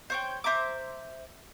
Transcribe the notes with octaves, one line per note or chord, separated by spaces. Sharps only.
C5 C#5 G5
C5 E5 A#5 D6